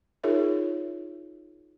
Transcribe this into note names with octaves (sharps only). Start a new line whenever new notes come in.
D#4 F4 G#4 A#4 C#5 E5